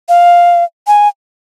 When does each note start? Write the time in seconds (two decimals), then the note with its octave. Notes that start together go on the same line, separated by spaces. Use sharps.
0.09 F5
0.87 G#5